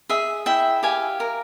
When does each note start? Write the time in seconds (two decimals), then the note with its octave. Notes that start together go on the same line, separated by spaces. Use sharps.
0.09 G#4 E5
0.46 E4 E5 G5
0.83 G4 F5 G#5
1.20 A#4